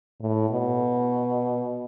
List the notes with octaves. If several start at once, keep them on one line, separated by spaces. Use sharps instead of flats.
A2
B2